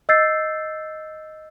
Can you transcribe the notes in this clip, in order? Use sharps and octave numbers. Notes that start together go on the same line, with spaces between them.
D#5 E6 G6 A6 C7